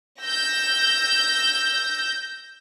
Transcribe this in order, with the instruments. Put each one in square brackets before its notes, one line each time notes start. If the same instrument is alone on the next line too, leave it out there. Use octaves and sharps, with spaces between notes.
[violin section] E6 G6 A#6